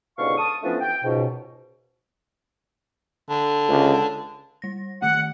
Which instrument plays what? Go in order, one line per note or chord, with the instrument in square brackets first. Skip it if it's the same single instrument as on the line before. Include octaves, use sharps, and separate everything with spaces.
[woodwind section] C#2 G#2 B2 D3 F5 C#6
A5 C#6 D#6
E3 F3 A3 B3 C#4 D4
G5
C#2 G#2 B2
[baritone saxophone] D3
[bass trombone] C#2
[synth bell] G3 A#6
[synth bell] D#3 A3 [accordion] F#5